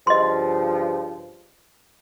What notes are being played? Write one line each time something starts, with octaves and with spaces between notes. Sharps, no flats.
G2 C#3 F3 D#5 C6